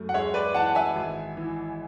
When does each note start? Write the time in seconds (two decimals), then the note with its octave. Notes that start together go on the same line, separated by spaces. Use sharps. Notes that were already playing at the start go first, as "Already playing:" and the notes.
Already playing: F#2 A3
0.09 F#5
0.14 G#3 C#5 E5
0.34 B4 D5
0.54 E3 F#5 A5
0.66 F#5
0.75 E5 G#5
0.96 G#1
1.37 E3